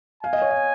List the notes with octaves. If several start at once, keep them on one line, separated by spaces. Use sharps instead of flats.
F5 G#5
D#5
C#5
D#5